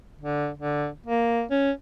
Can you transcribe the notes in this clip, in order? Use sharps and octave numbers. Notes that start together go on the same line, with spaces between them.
D3
D3
A#3
C#4